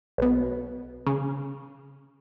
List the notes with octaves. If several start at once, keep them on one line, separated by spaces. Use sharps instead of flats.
B1 B2
C#3